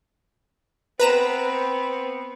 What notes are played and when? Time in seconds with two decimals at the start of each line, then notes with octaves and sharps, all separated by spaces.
1.00 B3 C4 B4 A#5 E7